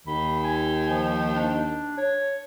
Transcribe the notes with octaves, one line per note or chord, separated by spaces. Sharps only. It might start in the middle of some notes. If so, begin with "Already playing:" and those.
D#2 B5
G#5
F3
D4
C#5